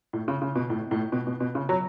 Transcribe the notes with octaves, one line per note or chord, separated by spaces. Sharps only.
A2
C#3
C#3
B2
A2
A2
B2
B2
B2
C#3
F#3